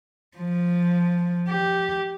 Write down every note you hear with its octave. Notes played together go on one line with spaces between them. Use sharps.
F3
G4